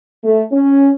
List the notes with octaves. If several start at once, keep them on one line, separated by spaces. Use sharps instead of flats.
A3
C#4